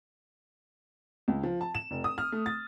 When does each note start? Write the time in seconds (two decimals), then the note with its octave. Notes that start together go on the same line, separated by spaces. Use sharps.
1.28 C#2
1.43 F3
1.61 A5
1.75 E7
1.91 F1
2.04 D#6
2.18 F6
2.32 A3
2.46 A6